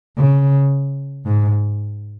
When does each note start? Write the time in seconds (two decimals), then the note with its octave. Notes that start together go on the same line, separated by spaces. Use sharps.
0.17 C#3
1.25 G#2